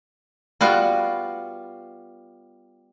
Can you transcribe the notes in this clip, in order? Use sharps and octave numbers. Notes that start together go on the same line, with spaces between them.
G3 B3 F4 F#4